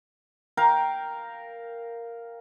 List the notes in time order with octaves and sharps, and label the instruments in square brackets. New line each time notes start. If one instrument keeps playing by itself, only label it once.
[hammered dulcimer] A#4 F5 G5